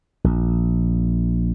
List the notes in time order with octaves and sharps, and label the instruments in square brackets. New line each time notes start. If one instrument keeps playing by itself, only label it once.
[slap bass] A#1